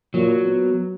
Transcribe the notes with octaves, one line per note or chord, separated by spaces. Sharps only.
A#2 F#3
B3